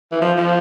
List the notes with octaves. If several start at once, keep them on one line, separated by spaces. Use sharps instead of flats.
E3
F3
F3